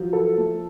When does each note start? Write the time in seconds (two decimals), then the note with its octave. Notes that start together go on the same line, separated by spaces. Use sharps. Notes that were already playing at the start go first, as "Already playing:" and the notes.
Already playing: F3 F#3
0.13 A4
0.38 A3